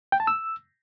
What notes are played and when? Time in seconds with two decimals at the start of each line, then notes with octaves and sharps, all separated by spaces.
0.12 G5
0.20 A5
0.27 E6